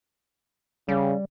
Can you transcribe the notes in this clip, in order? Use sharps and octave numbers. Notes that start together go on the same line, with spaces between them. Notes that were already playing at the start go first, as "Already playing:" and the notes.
C#3 G3